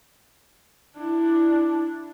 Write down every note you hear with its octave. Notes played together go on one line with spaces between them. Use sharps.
D4 E4